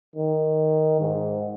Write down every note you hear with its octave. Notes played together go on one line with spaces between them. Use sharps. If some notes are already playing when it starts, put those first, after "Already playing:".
D#3
G#2